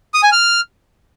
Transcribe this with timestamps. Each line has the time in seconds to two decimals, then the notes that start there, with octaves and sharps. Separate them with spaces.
0.14 D#6
0.23 G#5
0.32 F6